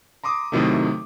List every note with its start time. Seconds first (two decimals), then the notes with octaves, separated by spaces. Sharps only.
0.24 A#5 C6 D6 D#6
0.52 A2 C3 D#3 F#3 A3